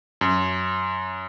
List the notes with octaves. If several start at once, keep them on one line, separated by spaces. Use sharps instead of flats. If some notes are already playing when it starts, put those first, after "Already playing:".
F#2